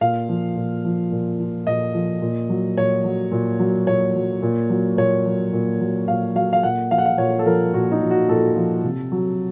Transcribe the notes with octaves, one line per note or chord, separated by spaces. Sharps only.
A#2 F5
F3
A#2
F3
A#2
F3
A#2 D#5
F3
A#2
F#3
A#2 C#5
F#3
A#2
F#3
A#2 C#5
F#3
A#2
F#3
A#2 C#5
F#3
A#2
F#3
A#2 F5
F#3 F5
F5
A#2 F#5
F3 F5
F#5
F5
A#2 C#5
A4
F3 A#4
A#2 F#4
D#4
F3
F#4
A#2 A4
F3
C3
F#3